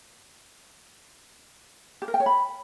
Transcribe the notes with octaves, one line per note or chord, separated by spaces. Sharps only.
G4
A#4
G5
C#5
B5